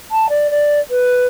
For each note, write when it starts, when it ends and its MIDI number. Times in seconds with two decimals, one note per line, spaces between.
0.11 0.26 81
0.29 0.47 74
0.51 0.79 74
0.90 1.27 71